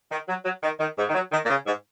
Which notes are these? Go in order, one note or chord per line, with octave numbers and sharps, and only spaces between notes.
D#3
F#3
F#3
D#3
D#3
G#2
D#3
F#3
D#3
A#2
C#3
G#2